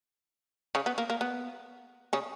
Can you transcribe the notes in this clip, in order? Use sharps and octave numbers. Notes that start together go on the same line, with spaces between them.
C#3 C#4
B3
A#3
A#3
B3
C#3 C#4